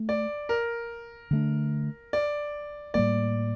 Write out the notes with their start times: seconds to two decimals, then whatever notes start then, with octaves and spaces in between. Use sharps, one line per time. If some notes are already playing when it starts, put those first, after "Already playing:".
Already playing: A3
0.09 D5
0.49 A#4
1.31 D3 A3 D4
2.13 D5
2.94 A2 G3 A#3 D5